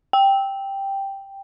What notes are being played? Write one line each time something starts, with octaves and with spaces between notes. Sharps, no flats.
G5